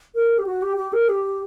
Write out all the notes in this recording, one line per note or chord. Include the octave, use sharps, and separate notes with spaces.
A#4
G4
F#4
G4
G4
A#4
G4